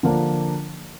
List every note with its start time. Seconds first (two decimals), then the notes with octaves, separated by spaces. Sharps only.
0.03 D3 F3 A#3 D4